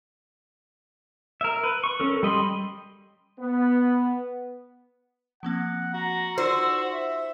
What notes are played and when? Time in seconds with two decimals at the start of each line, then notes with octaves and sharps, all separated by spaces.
1.41 A#4 E5
1.64 B4
1.84 C#6
2.00 C#4 A4 A#4
2.23 G3 D#5 B5 C6
3.39 B3
5.43 F3 A#3 C4 F#5
5.94 F#4 A#5
6.38 D#4 F4 C5 D5 E6
6.92 E5